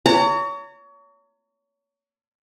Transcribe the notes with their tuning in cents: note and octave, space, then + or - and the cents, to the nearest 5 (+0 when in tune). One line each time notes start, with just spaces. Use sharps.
C#5 +30 A#5 -35